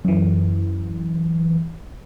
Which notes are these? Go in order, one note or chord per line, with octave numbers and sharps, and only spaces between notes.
F#2 E3